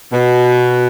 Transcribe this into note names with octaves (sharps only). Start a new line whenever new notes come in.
B2